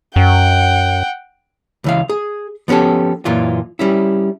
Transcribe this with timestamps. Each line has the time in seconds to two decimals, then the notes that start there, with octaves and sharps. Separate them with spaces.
0.16 F#2 F#5 G5
1.84 C#2 E3 F5
2.10 G#4
2.68 F3 B3 C#4 G4 A4
3.25 F#2 A#2 E3 F4
3.79 G3 C#4 E4